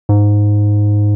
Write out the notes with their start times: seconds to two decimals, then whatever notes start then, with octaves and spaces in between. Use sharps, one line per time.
0.09 G#2